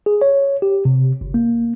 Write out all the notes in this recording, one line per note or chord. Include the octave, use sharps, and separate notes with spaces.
G#4
C#5
G4
C3
G1
A#3